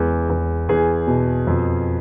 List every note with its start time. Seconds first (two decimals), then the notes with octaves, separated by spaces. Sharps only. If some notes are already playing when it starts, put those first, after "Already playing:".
Already playing: E2 G#3
0.30 E2
0.69 E2 G#4
1.07 B2
1.47 F2